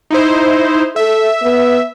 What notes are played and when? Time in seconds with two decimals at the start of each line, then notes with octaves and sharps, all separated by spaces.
0.10 D#4 E4 C5
0.96 A4 E5
1.42 B3